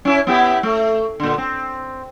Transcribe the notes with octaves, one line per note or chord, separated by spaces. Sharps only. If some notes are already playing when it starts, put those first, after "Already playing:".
C#4 E4
B3 E4 G4
A3
A#2 D3
C4